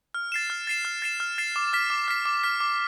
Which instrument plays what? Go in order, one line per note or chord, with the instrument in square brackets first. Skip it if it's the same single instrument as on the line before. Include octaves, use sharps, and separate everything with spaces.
[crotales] F6
A6 C7 E7
F6
A6 C7 E7
F6
A6 C7 E7
F6
A6 C7 E7
D6
F6 B6
D6
F6 B6
D6
F6 B6
D6